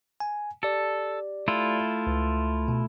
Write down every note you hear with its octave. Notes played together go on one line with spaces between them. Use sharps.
G#5
G4 A4 D5
A3 E4 F4
C#2
B2